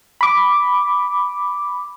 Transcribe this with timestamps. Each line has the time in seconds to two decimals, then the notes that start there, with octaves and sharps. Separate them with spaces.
0.21 B5 D6